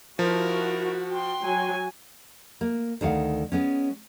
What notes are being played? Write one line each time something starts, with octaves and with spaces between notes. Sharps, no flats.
F3 E4 F#4 A#4
G5 C6
F#3 G#5
A#3
D2 D#3 C#5 F5 F#5
G#3 B3 C#4